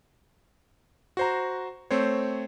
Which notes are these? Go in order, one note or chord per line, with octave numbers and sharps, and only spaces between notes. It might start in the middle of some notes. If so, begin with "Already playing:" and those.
F#4 C5 A#5
A3 C4 C5 C#5